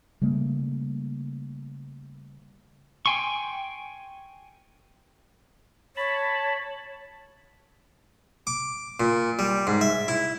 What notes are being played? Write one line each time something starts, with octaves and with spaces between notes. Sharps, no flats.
C#3 G3 A3 A#3
G5 G#5 C6 C#6
C#5 A5 B5
D6
A#2
G3
G#2
E5
E4